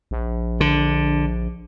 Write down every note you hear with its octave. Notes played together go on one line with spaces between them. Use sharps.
A#1
D3